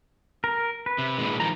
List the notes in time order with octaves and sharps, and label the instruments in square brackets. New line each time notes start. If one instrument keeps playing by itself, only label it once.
[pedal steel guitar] A#4
B4
[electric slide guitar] C3
A#2 D#3 G#3
[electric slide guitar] D#3 F3 [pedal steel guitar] A#5